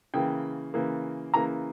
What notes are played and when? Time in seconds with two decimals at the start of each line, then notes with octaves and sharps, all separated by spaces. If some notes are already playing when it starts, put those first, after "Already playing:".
0.14 C#3 E3 A#3 G5
0.74 C#3 E3 A#3
1.34 C#3 E3 A#3 A#5